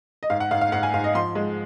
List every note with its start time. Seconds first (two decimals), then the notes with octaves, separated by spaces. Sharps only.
0.23 D#5
0.30 G#2 F5
0.40 F#5
0.51 G#2 F5
0.61 F5
0.72 G#2 F#5
0.83 G#5
0.94 G#2 F5
1.04 D#5
1.15 F3 C6
1.35 G#3